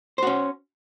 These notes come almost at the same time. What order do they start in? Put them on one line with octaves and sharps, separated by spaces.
C5 F#4 C#4